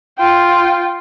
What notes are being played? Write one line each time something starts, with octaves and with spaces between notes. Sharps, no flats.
F4 G5